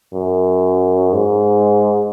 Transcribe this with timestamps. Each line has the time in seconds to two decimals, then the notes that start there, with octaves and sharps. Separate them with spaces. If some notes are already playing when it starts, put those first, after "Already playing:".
0.13 F#2
1.13 G#2